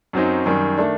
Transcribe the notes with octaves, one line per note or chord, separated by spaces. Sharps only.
F#2 F#3 C4 D#4
F#2 D#3 G3
D#3 A3 D4